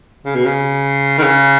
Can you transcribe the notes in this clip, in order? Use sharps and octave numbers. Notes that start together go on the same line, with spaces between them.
C#3
B2
C#3
D#3
C#3